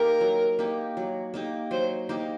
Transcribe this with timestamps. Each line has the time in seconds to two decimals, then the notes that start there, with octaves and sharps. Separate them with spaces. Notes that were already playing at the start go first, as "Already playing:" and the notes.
Already playing: A#3 D#4 G4 A#4
0.21 F#3
0.59 A#3 D#4 G4
0.97 F#3
1.34 A#3 D#4 G4
1.71 F#3 C5
2.09 A#3 D#4 G4